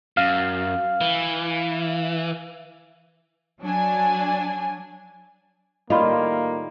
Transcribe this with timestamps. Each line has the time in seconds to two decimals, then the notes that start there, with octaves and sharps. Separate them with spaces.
0.17 F#2 F5
1.01 E3
3.60 F#3 D4 G#5
5.90 A2 D#3 G3 A#3 F4 D#5 B5 C6